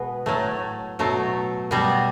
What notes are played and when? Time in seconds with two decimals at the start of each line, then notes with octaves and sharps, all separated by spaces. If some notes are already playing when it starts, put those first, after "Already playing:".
Already playing: B2 G#3 B3 B4
0.26 A2 F#3 A3
0.99 B2 F#3 A3
1.71 B2 G3 B3